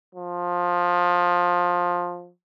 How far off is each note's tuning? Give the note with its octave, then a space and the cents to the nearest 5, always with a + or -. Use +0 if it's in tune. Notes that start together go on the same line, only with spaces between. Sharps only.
F3 +15